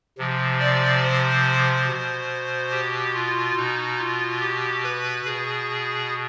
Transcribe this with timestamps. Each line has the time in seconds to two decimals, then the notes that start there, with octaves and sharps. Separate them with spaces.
0.18 C3 F3
0.60 D5
1.03 C5
1.87 B2
2.71 G4
3.15 F4
3.56 B2 D#4
3.99 F4
4.41 G4
4.83 B4
5.25 B2 G#4